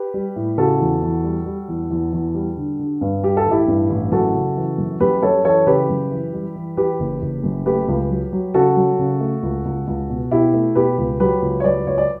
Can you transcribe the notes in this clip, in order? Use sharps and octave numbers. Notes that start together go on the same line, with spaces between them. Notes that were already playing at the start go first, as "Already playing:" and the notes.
Already playing: G4 B4
G3
A2
C#3 F#4 A4
E2
E2
G3
G3
E2
E2
E2
G3
D3
D3
G2
G3 G4
A4
A1
E4 G4
G2
A1
F#2 F#4 A4
C#3
E3
F#2
F#2 G4 B4
F#2 A4 C#5
E3 A4 C#5
C#3 G4 B4
F#2
E3
G3
E3
E3 G4 B4
F#1
F#1
F#2
A3 G4 B4
C#2
F#3
F#3
C#3 F#4 A4
F#3
C#3
A3
C#2
C#2
C#2
B2
B2 E4 G4
A3
B2 G4 B4
C#2
F#3 G4 B4
C#2
C#5
F#3 B4 D5
C#2 C#5
D5